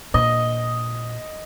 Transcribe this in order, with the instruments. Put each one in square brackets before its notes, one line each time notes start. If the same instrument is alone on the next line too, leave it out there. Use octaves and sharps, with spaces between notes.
[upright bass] A#2 [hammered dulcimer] D#5